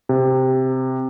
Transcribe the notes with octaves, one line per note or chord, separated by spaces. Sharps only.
C3